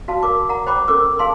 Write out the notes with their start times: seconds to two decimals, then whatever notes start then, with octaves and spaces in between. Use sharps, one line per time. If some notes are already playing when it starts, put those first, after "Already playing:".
0.08 F#4 F5 A5
0.23 A#4 D6
0.49 F#5 A#5
0.67 C5 G5 B5 D6
0.88 C#4 A4 A#4 D6 E6
1.19 G#4 F5 A5 C6